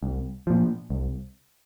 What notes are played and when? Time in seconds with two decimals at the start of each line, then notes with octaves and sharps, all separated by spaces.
0.03 C2
0.47 A#2 F3
0.90 C2